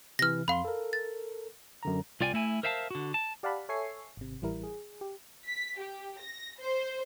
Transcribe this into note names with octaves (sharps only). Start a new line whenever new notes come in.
C3 E3 F6 A#6
F2 F5 B5 C6
A4 A#4
A6
F#2 D3 A#5
C2 F4 D5 G5 G#5
A3 E4 G#5
A#4 C5 E5 F5 G5 A5
D3 F#4
A5
G4 D5 F5 F#5 A5 B5
A4 C#5 E5 G#5 C#6 C7
G#1 C3
A1 E3 G3 E4 A#4
G#4
G4
B6
G4
A#6
C5